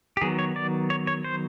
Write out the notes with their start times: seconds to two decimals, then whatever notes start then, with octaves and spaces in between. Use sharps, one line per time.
0.17 G4
0.21 D#3 F#3 B3 G#4
0.39 C#5
0.56 D5
0.90 C#5
1.07 C#5
1.24 C5